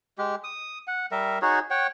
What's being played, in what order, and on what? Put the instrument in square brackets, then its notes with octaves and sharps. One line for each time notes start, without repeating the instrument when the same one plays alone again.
[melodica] G#3 G4
D#6
F#5
G3 A#4 E5
D#4 F#4 G#4 C#5
C#5 F#5 G5